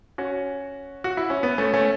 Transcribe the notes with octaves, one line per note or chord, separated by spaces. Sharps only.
C#4 F#4
F#4
E4
C#4
B3
A3 C#4
A3 C#4